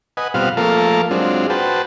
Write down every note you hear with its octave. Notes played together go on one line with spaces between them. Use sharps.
B4 D#5 F#5 G#5
B2 G3 C4 F4 F5 F#5
F3 A3 A#3 A4 A#4 F5
F#3 G#3 C4 D4 F4
F#4 B4 C5 G5 A5